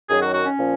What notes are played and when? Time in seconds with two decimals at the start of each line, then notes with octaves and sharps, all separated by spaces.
0.10 F#2 D#3 F#3 G#4
0.22 F#4
0.34 F#4
0.46 C#4
0.58 A#2 F3